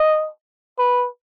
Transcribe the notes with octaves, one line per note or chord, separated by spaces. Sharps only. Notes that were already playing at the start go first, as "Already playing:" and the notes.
Already playing: D#5
B4